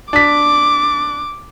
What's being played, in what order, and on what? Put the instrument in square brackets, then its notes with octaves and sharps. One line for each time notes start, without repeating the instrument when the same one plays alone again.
[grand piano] D4 B6 [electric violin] D6